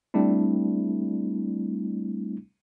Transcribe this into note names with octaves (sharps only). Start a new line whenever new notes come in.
G3 A3 C4 D4 E4